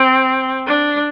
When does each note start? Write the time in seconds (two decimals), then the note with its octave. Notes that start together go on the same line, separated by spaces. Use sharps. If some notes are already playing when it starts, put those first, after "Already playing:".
Already playing: C4
0.67 D4